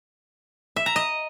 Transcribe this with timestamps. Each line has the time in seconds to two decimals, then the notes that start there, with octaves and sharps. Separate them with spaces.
0.76 E5
0.86 A#5
0.96 D#5